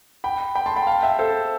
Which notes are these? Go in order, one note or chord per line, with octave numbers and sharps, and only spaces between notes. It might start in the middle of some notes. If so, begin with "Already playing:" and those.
G5 B5
G5 B5
A5 C6
G5 B5
F5 A5
E5 G5
A4 C5